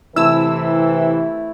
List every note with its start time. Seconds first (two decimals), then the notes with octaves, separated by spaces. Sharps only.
0.16 C3 E3 A3 E4 E6